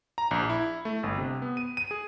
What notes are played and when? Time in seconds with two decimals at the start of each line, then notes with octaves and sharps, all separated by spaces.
0.18 A#5
0.31 A#1
0.49 E4
0.85 A3
1.03 G1
1.18 C3
1.42 B3
1.57 D#7
1.77 D#7
1.91 G#4